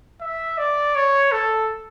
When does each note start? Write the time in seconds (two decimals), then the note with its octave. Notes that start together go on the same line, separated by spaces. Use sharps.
0.21 E5
0.58 D5
0.95 C#5
1.32 A4